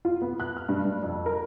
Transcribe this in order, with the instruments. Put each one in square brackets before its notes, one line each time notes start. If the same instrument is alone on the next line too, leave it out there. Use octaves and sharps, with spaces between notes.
[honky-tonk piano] F4
B3
F#6
F6
G2
G2
F2
A#4